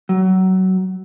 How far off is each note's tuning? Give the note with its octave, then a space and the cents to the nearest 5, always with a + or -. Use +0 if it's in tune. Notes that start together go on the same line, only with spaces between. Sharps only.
F#3 +20